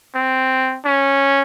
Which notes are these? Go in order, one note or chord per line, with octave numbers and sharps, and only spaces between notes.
C4
C#4